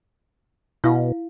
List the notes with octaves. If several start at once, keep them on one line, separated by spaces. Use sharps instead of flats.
B2 E4 F5